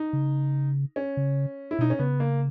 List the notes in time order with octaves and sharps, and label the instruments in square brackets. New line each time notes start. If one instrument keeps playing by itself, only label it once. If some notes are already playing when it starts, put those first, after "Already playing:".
Already playing: [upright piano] D#4
[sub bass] C#3
[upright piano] C#4
[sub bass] C#3
[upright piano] E4
[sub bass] B2 [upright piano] D#4
[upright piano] C#4
[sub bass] C#3 [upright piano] B3
[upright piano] A#3